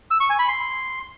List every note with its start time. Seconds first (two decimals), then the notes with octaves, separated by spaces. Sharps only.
0.11 E6
0.20 C#6
0.30 G#5
0.39 B5
0.48 C6